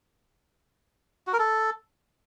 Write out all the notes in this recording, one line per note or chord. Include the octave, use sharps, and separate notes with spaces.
F#4
A#4
A4